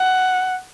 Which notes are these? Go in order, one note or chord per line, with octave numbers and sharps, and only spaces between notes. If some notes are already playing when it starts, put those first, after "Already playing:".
Already playing: F#5